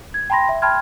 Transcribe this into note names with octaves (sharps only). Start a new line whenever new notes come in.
G#6
G5 A5 B5 C6 A#6
E5
G5 A5 B5 C6 F6 G#6